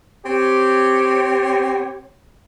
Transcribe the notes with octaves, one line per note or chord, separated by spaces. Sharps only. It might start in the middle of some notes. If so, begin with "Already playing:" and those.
C4 G4 C#5